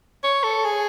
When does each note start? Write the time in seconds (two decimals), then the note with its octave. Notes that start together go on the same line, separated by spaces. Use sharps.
0.24 C#5
0.44 A4
0.64 G#4